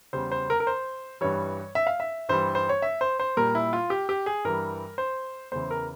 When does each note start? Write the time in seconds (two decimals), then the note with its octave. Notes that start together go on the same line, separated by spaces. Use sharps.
0.13 E2 C#3 G3 C5
0.32 C5
0.50 A#4
0.60 A#4
0.67 C5
1.21 G2 E3 G3 C#5
1.75 E5
1.87 F5
2.00 E5
2.29 G2 E3 G3 C5
2.55 C5
2.69 C#5
2.82 E5
3.01 C5
3.20 C5
3.37 A#2 G3 A#4
3.55 E4
3.73 F4
3.90 G4
4.09 G4
4.26 G#4
4.44 G2 E3 G3 A#4
4.98 C5
5.52 E2 C#3 E3 C5
5.71 A#4